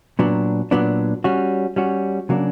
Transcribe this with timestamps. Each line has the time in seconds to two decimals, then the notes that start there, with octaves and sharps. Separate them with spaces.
0.19 A#2 F#3 B3 D4
0.71 A#2 F#3 B3 D4
1.24 G3 C#4 F#4
1.76 G3 C#4 F#4
2.29 C#3 F#3 A#3 D4